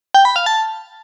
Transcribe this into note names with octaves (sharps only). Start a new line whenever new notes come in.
G5
B5
F5
A5